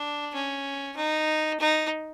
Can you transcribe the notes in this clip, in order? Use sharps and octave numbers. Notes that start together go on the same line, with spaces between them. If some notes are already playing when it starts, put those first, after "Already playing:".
Already playing: D4
C#4
D#4
D#4